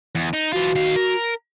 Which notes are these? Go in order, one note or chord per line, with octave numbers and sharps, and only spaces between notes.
E2
D#4
E3 F4 F#4
D#3 F5
A#4